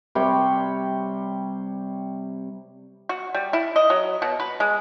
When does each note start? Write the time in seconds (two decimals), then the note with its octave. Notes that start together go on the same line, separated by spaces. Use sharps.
0.15 C3 G3 C#5 G5
3.09 F#4
3.34 G3
3.53 E4
3.76 D#5
3.90 F#3
4.22 B2
4.40 B4
4.60 G#3